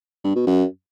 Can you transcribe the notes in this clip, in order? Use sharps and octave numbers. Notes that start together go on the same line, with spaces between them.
G2
B2
F#2